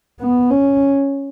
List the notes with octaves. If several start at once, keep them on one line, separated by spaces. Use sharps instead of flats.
B3
C#4